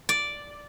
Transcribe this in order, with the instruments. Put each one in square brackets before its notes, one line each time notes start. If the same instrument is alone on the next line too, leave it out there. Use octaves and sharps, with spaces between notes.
[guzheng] D5